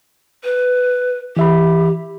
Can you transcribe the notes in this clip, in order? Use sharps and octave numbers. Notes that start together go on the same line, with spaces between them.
B4
E3 G4 E5 B5